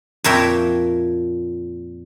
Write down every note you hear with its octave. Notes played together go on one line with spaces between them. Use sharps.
F2 A#2 A#4 C#5 E5 G5